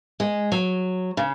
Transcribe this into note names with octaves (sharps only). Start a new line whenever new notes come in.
G#3
F#3
C#3